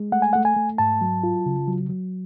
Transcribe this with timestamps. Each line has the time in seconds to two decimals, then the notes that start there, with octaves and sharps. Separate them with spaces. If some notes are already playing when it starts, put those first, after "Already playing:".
Already playing: G#3
0.12 A3 F#5
0.22 G#5
0.33 A3 F#5
0.45 G#5
0.56 A3
0.78 G#2 A5
1.01 F#3
1.23 F4
1.46 C#3
1.68 F#3
1.89 F#3